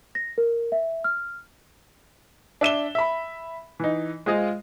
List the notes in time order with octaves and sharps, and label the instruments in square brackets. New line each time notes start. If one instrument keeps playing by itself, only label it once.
[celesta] A#6
A#4
E5
F6
[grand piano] D4 E5 E7 G7
E5 B5
E3 D#4
G#3 F4 G#4 C5 D#5 F5